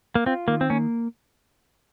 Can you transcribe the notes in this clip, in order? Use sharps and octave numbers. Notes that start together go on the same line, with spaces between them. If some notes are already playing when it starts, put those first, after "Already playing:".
A#3
C4 F4
D#3 A#3
C4
A#3 C#4